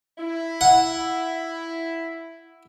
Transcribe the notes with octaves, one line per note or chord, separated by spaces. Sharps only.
E4
F#5